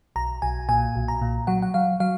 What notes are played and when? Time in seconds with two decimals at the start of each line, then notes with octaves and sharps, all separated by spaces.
0.16 B1 A#5
0.42 B1 G#5
0.69 A#2 G#5
0.96 B1
1.08 A#5
1.22 A#2
1.47 F#3 F#5
1.62 F#5
1.74 F#3 F5
2.00 F#3 F5